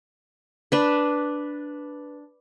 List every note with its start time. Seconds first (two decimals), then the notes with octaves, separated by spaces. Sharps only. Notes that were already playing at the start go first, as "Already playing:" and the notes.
0.72 D4 B4